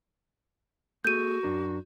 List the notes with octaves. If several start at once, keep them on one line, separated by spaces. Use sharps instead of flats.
A#3 F#4 G#4 A4 G6 D#7
F#2 D4 A#4